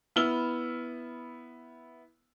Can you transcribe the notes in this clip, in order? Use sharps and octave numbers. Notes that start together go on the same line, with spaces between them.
B3 E4 E6 F6 G7